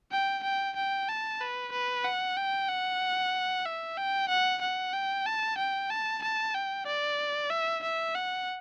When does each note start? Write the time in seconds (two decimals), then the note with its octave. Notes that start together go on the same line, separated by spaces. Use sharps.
0.12 G5
0.43 G5
0.76 G5
1.08 A5
1.41 B4
1.72 B4
2.05 F#5
2.37 G5
2.69 F#5
3.65 E5
3.97 G5
4.29 F#5
4.62 F#5
4.93 G5
5.26 A5
5.58 G5
5.90 A5
6.22 A5
6.54 G5
6.86 D5
7.50 E5
7.83 E5
8.15 F#5